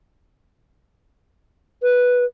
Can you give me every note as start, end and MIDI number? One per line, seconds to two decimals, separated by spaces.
1.83 2.25 71